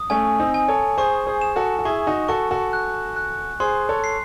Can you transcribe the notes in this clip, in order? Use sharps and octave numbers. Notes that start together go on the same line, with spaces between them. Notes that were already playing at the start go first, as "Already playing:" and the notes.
Already playing: D#6
A3 C#4 G#5
C4 D#4
G#5
A4 C#5
G#4 C5 C#6
G#4 C5
E7
F#4 A4
F#4
E4 G#4 C#6
D#4 F#4
F#4 A4 C#6
F#4 A4
F#6
F#6
G#4 C5 C6
A4 C#5
C7